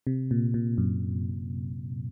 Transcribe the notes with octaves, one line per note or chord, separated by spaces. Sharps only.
C3
A#2
A#2
F#2